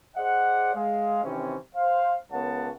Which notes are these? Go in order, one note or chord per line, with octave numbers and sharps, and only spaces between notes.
G#4 C5 D5 D#5 F#5
G#3 F5
C3 D#3 E3 C4 C#4
C5 F5
C#2 B3 A#4 C#5 F#5 A5